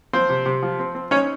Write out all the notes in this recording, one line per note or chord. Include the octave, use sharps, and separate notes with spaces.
F3 C4 C5
C3
C3
F3
C4
C4
C#4 D#4 C#5